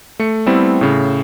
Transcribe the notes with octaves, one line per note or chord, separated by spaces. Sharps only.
A3 C#7
G3 A3 B3 C4 E4 A4
A2 C#3